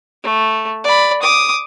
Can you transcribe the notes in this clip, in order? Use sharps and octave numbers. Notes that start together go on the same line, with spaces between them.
A3
D5 B5
D6 D#6